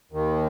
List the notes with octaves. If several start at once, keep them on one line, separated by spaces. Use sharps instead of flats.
D#2 D#3